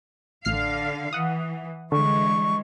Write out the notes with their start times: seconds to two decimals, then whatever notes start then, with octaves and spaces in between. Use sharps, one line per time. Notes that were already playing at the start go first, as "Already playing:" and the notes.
0.45 A1 D3 F5 F6 C7
1.13 E3 F#5 D#6
1.92 D3 E3 G3 G#3 C#6